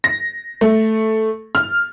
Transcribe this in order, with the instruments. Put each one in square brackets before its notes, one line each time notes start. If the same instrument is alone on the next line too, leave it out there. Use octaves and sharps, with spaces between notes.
[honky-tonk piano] A#6
A3
F6